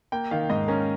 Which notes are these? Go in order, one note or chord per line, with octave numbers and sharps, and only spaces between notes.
A#3 G5
D#3 F5
G#2 D#5
C#4 A#4